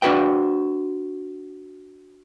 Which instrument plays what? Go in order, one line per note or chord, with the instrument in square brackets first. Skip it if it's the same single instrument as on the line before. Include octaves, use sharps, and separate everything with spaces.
[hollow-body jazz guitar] D4 F#4 B4 C5 G5